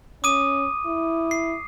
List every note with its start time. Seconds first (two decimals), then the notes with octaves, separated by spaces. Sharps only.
0.24 C#4 D6 D#6 D#7
0.86 E4
1.31 C7